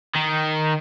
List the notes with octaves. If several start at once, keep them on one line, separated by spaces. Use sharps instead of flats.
D#3